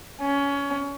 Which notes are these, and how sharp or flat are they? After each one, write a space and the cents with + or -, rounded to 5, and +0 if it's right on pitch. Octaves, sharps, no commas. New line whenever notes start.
C#4 +20